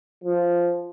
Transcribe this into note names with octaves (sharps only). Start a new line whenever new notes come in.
F3